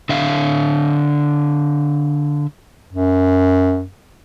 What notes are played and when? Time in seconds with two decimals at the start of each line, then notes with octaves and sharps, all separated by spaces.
0.09 D3 E5 F5
2.93 F#2